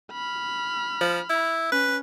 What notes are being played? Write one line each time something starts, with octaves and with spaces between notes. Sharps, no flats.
B5 F6
F3
E4
C#4 B4